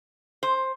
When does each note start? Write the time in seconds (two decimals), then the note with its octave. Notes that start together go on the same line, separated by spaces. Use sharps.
0.43 C5